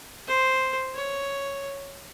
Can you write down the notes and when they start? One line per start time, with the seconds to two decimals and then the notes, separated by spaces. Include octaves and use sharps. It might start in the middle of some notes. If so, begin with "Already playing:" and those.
0.28 C5
0.95 C#5